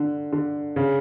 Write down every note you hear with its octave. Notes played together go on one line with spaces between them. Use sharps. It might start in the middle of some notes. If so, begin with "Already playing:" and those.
Already playing: D3
D3
C#3